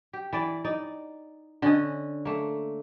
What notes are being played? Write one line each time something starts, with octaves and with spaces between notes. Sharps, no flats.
G4
E3 D5
D#4 D5
D3 C#4 D#5
A3 A#3